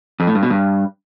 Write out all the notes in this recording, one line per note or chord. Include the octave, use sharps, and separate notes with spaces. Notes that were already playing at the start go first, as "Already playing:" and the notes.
F2
A2
G2
B2
G2